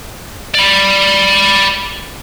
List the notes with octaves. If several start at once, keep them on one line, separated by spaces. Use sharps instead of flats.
D5 B5